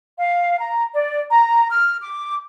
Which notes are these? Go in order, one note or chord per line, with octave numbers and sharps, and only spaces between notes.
F5
A#5
D5
A#5
F6
D6